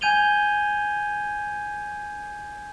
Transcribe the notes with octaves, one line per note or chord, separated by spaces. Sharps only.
G#5 G6 G#6 D#7 F7 G7